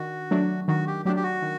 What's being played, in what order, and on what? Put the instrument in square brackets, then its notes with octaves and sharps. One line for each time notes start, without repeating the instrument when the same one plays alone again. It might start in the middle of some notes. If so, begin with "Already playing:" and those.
Already playing: [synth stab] D#3 D4 [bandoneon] F#4
[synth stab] F#3 A3 D4
[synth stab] D#3 [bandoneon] F#4
[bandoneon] G4
[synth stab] F#3 A3 D4 [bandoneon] G4
[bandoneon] G4
F#4
[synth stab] D#3